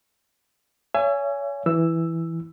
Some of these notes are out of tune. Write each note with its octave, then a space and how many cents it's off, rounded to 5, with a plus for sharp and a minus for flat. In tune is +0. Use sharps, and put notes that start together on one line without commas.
C#5 +30 E5 +40 G#5 +0
E3 +0 E6 +5